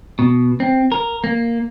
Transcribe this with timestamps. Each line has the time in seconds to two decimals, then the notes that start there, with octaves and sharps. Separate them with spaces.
0.19 B2
0.60 C4
0.92 A#4
1.24 A#3